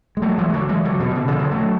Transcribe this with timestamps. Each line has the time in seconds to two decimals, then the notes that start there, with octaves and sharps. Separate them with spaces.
0.17 G#3
0.22 F#3 A3
0.38 E3 G#3
0.50 G#3
0.54 D3 F#3
0.69 E3 G#3
0.84 D3 F#3
1.00 B2 D3
1.10 C#3
1.15 B2 D3
1.28 C#3 E3
1.39 D3 F#3
1.51 F#3 A3